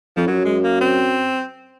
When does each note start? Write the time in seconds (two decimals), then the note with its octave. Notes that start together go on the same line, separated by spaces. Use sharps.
0.17 F2 F3
0.27 F#2 F#3
0.45 G#3
0.64 A#3
0.81 C4